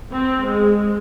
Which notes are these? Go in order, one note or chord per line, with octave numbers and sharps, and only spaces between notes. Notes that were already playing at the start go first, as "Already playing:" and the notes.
C4
G#3